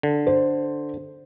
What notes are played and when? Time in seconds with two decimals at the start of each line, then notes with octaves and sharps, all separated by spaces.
0.03 D3
0.27 C5